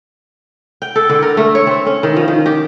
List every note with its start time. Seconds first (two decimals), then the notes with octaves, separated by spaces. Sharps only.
0.82 G5
0.96 A4
1.09 D3
1.22 A#4
1.37 A3
1.55 C#5
1.67 C4
1.86 C#4
2.03 D#3
2.16 F3
2.28 D#3
2.46 G4